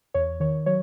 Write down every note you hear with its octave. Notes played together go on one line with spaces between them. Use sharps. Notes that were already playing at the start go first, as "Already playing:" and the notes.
E2 C#5
D#3 C#5
F#3 C#5